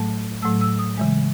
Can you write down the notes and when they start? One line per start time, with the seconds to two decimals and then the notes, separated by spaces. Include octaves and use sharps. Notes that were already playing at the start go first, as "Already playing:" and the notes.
Already playing: A2 F#3 A3 A5
0.42 A2 F#3 A3 E6
0.61 E6
0.79 D#6
0.97 C#3 E3 G#3